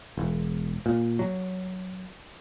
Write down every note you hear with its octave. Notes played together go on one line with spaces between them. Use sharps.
E1
A#2
F#3